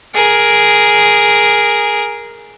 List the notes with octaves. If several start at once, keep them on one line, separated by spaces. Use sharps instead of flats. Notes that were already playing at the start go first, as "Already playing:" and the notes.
G#4 A#4